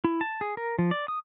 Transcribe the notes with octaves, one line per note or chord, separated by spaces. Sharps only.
E4
A5
G#4
A#4
F3
D5
D#6